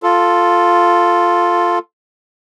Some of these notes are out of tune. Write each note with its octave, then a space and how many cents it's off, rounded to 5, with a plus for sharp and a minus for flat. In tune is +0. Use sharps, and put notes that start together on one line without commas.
F4 +0 A4 +0